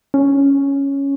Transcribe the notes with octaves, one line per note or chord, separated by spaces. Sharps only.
C#4